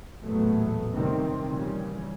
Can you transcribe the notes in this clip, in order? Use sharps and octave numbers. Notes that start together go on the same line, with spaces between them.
A1 E2 A#2 F#3 A3 B3
C3 D#3 G3 C4
A#2 C#3 E3 G3